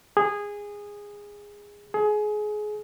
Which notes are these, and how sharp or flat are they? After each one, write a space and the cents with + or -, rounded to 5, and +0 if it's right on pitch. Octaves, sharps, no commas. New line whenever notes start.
G#4 -15
G#4 +25